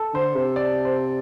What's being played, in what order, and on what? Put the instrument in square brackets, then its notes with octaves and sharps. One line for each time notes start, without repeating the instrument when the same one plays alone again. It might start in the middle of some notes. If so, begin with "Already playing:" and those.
Already playing: [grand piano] A4
[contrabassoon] D3 [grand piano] C5
[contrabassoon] C3 [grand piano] C5
[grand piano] D5
C5